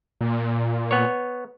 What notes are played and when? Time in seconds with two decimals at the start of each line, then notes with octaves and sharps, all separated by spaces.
0.21 A#2
0.91 B3 C#5